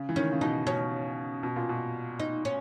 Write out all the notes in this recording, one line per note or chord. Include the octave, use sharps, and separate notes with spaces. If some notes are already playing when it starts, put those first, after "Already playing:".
Already playing: C#3
E3
D#3 C#4
C#3
B2 D#4
B2 C#4
B2
A#2
B2
D#4
C#4